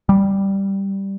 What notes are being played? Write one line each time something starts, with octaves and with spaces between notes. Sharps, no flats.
G3